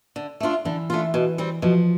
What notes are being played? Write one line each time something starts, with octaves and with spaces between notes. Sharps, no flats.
D3
A3 D4 F4
D3 E3
A3 D4 F4
B2
G3 C4
B2 F3